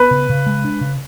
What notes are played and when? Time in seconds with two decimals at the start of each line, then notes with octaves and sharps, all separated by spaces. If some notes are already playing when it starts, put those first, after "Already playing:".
Already playing: B3 B4
0.11 C#3
0.29 C#3
0.46 G#3
0.64 D4
0.81 C#3